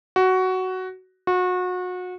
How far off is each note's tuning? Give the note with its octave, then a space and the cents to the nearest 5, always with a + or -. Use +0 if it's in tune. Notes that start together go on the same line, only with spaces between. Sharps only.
F#4 +10
F#4 -30